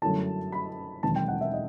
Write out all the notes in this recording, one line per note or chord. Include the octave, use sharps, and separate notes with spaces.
G1 F#2 F#3 A3 E4 A5
B5
E1 D#2 D#3 F#3 C4 A5
G5
F#5
E5
D#5